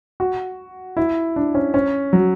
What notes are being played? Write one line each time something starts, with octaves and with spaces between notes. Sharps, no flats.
F#4
E4
D4
C#4
C#4
F#3